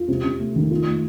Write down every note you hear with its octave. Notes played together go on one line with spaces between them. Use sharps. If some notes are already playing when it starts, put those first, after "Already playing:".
Already playing: F4
C3
C3
A3
D#3
F4
A3